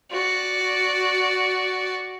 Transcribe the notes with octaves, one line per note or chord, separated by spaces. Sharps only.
F#4 D5